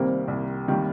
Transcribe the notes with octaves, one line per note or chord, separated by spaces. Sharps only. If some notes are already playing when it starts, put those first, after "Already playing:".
Already playing: C2 C3 D#3 G3 A#3 C4
C2
C3 D#3 G3 A#3